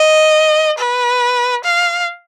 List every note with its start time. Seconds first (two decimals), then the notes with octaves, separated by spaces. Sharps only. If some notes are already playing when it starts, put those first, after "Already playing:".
Already playing: D#5
0.78 B4
1.64 F5